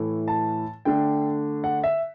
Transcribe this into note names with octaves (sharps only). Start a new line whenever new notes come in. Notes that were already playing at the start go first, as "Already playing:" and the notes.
Already playing: A2 E3 A3
A5
D3 A3 D4 G5
F#5
E5